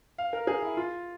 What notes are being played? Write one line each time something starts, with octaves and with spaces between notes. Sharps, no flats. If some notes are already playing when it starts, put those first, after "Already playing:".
F5
A#4
G#4
E4
F4